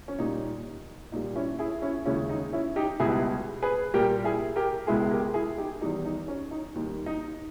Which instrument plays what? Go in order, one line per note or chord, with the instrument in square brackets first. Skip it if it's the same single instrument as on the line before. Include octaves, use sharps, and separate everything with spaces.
[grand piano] C#4
A#2 G3 D#4
A#2 G3 D#4
C#4 E4
E4 G#4
C#4 E4
D#2 C#3 G#3 C#4 E4
D#4
C#4 E4
D#4 G4
C#2 B2 G3 E4 G#4
G#4 B4
A#2 G3 G4 A#4
E4 G#4
G4 A#4
C#2 B2 G#3 E4 G#4
G4 A#4
E4 G#4
D#4 G4
E2 D#3 G3 D#4
D#4
C#4
D#4
D#2 D#3 G3
D#4